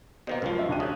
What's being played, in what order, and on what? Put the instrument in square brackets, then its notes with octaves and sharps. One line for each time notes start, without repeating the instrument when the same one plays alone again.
[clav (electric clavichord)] B2 D#3 A#3 [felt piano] C5 D#5
[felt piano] C#2 [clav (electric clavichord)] F#2 F3
[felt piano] D#5 E5
D#2 D4 D#7
[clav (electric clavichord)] C#3 [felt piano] D#6 F#6